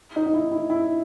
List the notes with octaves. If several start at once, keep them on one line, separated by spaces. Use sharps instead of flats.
D#4
D#4
E4
E4
E4